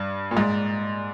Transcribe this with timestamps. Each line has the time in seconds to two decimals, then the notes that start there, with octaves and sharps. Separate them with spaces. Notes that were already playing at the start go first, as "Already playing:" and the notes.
Already playing: G2
0.31 A#2
0.37 G#2